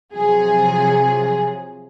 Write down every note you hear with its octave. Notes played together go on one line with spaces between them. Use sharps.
C3 F3 F#3 G#4